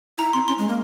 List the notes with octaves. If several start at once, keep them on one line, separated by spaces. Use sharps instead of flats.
E4 A#5
C4 C6
C#4 C6
G#3
A#3